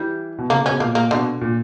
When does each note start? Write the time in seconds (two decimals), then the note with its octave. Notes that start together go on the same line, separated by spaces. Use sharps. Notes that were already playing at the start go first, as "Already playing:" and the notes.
Already playing: E3 G3
0.38 B2
0.50 C#3 A#3
0.66 B2 C#4
0.80 A#2 A#3
0.95 A#3
1.11 B2 D3
1.41 A#2